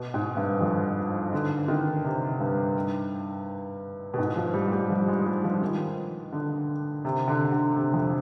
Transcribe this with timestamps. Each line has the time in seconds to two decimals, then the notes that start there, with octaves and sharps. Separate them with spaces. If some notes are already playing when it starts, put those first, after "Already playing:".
Already playing: B2
0.14 G#2
0.37 G2
0.61 F2
1.33 D3
1.68 D#3
2.05 C3
2.40 G2
4.14 B2
4.18 G#2
4.36 F3
4.54 G3
4.72 G3
4.90 F3
5.08 G#3
5.26 G3
5.44 F3
5.62 D#3
6.32 D3
7.05 C3
7.28 D3
7.52 D3
7.76 C3
7.94 F2